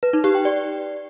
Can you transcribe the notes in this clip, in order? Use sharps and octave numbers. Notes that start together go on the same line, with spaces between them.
B4
D#4
G4
G5
D5